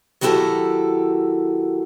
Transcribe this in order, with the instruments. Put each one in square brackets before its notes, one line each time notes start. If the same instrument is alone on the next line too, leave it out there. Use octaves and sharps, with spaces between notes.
[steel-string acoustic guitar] D#3 F#3 E4 F#4 G4 A4